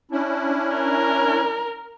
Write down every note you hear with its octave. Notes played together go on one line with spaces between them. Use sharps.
C#4 D4 E4
A#4